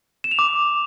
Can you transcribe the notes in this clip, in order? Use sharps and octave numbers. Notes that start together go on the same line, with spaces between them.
E7
F7
D6